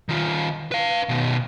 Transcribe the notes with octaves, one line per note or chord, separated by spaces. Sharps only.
D#3 F4
B4 F5
B2 D#3